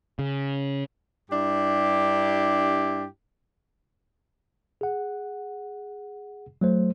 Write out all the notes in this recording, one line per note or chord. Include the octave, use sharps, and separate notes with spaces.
C#3
G2 D4 E4 G4
G#4 F#5
F#3 A3 C5